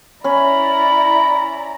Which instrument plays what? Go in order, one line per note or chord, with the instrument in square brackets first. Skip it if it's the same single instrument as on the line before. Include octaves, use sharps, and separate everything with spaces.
[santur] C#4 [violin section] E4 D5 A#5 [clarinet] B5